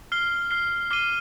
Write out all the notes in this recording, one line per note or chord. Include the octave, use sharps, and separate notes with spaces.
F6 C7 G7
F6 C7 G7
D6 F6 C7 D#7 G7